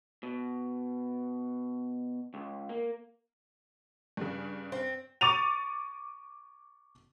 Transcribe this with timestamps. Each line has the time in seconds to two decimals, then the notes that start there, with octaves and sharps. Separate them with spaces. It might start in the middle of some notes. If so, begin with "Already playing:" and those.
0.23 B2
2.34 C#2
2.69 A#3
4.17 G2 C#3
4.72 C4
5.21 C#6 D6 A6 D#7 F7